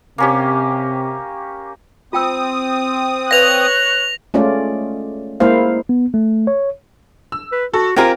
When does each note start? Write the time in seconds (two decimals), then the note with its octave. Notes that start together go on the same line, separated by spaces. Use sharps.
0.18 C3 A#3 C#4 G4
2.13 C4 F4 G5 D#6 E6
3.31 B4 C#5 D5 F5 F#6 A#6 F7
4.34 G#3 A3 C#4 F4 D5
5.40 G#3 A#3 E4 C5 F5
5.89 B3
6.14 A3
6.47 C#5
7.32 E6
7.52 B4
7.74 F#4 A4
7.96 C4 F4 G4 A#4 G#5 A#5